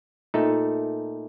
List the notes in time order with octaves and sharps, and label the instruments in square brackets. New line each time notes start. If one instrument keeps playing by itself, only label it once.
[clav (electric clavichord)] A#2 A3 D#4 A4